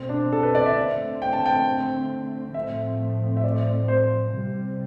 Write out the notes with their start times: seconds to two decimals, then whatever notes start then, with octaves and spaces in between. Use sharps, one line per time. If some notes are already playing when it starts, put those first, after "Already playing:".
Already playing: B2 A3 C4
0.09 D4
0.32 A4
0.43 B4
0.55 D5
0.66 E5
0.76 D3 A3 C4
1.22 G5
1.33 A5
1.46 G5
2.54 A2 F3 A3 C4 E5
3.37 E5
3.44 D5
3.88 C5
4.34 C3 G3 C4